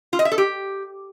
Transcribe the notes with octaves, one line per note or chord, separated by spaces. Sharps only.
F4
D#5
E5
A4
G4